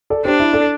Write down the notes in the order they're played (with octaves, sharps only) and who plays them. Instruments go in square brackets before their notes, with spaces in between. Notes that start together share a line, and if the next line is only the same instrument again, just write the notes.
[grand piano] A4 D5
[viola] D4 [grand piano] G4 C5
[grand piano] E4
A4 D5